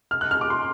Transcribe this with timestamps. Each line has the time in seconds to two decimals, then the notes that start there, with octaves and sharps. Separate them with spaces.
0.11 F6
0.21 F#6
0.31 F6
0.41 D6
0.50 C6